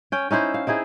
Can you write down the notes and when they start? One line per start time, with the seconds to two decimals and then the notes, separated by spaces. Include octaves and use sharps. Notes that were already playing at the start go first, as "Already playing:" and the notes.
0.12 C#4 G5
0.31 C#4 D#4 E4 C5
0.54 F5
0.67 C4 D#4 E4 G#4